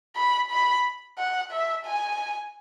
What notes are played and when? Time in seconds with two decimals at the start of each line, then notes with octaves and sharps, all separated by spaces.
0.16 B5
0.50 B5
1.18 F#5
1.51 E5
1.85 G#5